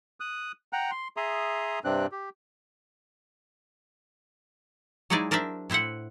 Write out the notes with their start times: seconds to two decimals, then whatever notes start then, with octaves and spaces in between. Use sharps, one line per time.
0.20 D#6 F#6
0.73 F#5 G5 A#5 F#6
0.91 C6
1.17 G#4 E5 A#5 C6 D#6
1.84 G2 C3 C4 D4 F#6
2.12 G4
5.10 F#3 G#3 D#4 E4 G#4 D5
5.31 D4 A#4 C5 D5 E5
5.70 A2 E4 C5 E5 F#5